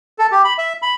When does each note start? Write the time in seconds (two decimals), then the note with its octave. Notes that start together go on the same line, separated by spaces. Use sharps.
0.19 A4
0.32 G4
0.45 B5
0.58 E5
0.82 B5